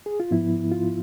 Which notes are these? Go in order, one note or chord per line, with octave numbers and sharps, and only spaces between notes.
G#4
F4
G#2 F3 B3 E4
F4